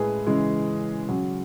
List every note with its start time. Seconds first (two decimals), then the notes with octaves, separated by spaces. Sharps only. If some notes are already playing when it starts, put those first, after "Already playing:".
Already playing: A2 G#3 G#4 B4
0.27 C#3 E3 G#3
1.08 C#3 F#3